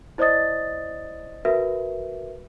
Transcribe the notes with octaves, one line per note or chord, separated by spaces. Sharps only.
E4 C5 D5 D#5 D#6 A6
F#4 A#4 B4 E5